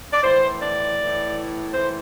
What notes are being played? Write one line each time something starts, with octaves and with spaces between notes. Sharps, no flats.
D5
A2 E3 C5
D5
A2 E3
A2 E3 C5